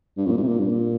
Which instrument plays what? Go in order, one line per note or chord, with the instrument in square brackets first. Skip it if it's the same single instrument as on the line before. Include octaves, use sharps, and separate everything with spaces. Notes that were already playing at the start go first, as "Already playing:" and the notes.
[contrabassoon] G2
F2
A#2
G2
C3
A#2
G2
A#2